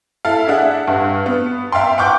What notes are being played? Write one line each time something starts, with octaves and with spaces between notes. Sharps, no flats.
E4 A4 F5
D4 G#4 E5 F#5
G2
B3
E5 F5 G5 C6
F#5 G5 C#6 D6 G6